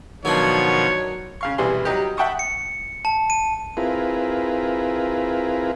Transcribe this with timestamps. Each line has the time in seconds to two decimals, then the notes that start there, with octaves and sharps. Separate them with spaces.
0.25 B2 D#3 F3 F#3 D4 C#5 G#6
1.41 C#3 F5 C#6
1.58 B1 C3 E3 G3 G#4 C6
1.85 F#3 G3 D#4 G4
2.17 E5 F#5 G5 A5 C#6 D#6
2.39 C#7
3.05 A5
3.30 D#7
3.77 C4 E4 F4 G#4 A#4 B4